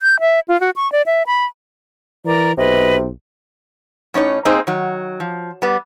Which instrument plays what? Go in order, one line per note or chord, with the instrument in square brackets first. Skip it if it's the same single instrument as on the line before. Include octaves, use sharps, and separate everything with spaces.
[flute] G6
E5
F4
F#4
C#6
D5
E5
B5
[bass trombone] E3 [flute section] A#4 D5 A#5
[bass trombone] B1 [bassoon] C3 [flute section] B4 D#5
[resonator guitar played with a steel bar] A2 C#4 D#4 C#5
A#3 C4 D#4 G#4 C5 D#5
D#3 F#3
F3
G3 B3